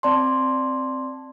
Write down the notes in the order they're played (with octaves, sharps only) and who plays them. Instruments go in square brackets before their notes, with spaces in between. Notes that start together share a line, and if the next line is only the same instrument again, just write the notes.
[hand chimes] C4 D5 A5 C6